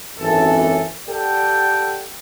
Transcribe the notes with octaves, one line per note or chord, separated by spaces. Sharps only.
G#1 F#2 E3 A4
G4 A4 D5 F#5 G5